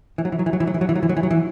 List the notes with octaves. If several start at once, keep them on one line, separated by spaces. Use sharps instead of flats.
E3
F#3
E3
F#3
E3
F#3
E3
F#3
E3
F#3
E3
F#3
E3
F#3
E3
F#3
E3